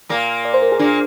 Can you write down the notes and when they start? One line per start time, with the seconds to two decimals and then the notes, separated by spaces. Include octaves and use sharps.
0.09 A#2 A#3
0.45 D5
0.54 C5
0.62 A#4
0.72 G#4
0.79 A#2 A#3 D4